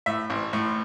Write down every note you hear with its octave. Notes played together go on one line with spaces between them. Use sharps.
A2 E5
A1
A2